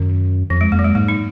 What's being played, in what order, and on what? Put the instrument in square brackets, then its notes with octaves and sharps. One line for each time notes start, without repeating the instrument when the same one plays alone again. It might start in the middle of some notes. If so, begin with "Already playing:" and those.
Already playing: [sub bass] F#2 [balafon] D#3
[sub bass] F2 [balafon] F3
[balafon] G#3
[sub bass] F2 [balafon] A#3
[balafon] F#3
G#3
[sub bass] G#2 [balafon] A#3
[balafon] D#4